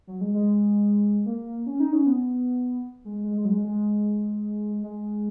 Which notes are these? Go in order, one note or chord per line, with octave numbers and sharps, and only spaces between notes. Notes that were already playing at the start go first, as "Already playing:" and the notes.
F#3
G#3
G#3
A#3
C#4
D#4
C#4
B3
G#3
G#3
G#3
F#3
G#3
G#3
G#3